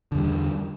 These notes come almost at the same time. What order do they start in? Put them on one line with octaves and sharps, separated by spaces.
D3 E2 G3